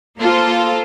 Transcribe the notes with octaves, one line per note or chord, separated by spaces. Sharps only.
A#3 F4 A4 C5